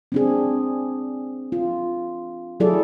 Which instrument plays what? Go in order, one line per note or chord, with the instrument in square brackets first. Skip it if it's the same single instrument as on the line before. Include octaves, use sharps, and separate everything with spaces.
[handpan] C4 D4 G#4
F4
F#3 E4 G#4 A4 D5